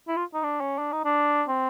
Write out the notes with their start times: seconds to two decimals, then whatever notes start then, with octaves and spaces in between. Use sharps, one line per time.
0.08 E4
0.16 F4
0.34 D#4
0.43 D4
0.61 C#4
0.78 D4
0.92 D#4
1.05 D4
1.48 C4